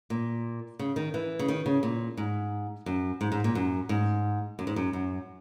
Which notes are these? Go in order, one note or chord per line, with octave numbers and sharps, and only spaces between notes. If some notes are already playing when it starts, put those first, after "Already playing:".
A#2
C#3
D#3
E3
C#3
D#3
C#3
A#2
G#2
F#2
G#2
G#2
A#2
F#2
G#2
F#2
G#2
F#2
F#2